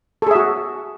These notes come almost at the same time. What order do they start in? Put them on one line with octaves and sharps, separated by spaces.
A4 G#4 E5 F#4